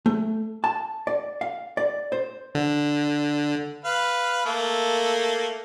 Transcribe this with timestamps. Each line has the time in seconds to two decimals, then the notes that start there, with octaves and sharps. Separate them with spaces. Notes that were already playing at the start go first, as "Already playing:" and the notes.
0.06 A3
0.64 A5
1.07 D5
1.41 F5
1.77 D5
2.12 C5
2.55 D3
3.85 B4 F5
4.45 A3 A#3 A4